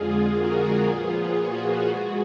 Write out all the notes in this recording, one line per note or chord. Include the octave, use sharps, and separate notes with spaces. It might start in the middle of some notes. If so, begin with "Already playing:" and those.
Already playing: F2 D3 G#3 F4 G#4
F#4 A#4
A#2 F3 B3 F4 G#4
F#4
B2 G#3 B3